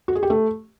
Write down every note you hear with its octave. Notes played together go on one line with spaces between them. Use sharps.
F#4
G#4
G4
A3